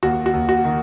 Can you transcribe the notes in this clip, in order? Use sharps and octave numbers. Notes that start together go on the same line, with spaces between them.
D#2 F#4
F#4
D#2
F#4
D#3